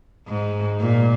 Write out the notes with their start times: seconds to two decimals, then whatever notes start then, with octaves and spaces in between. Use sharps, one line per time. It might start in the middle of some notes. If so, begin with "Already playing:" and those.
0.28 G#2
0.80 A#2